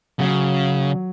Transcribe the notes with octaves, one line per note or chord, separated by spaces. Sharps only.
C#3 F#3